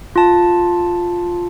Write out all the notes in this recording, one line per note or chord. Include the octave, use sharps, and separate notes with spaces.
F4 A5